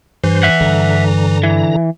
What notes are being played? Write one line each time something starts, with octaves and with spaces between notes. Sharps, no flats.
G2 E3 C5
E5 F#5
G2 D3 A#5
E3